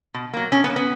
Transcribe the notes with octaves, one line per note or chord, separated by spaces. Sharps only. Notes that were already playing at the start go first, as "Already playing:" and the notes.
B2
F#3 A#3
B2 C#4
B3
A#3
B3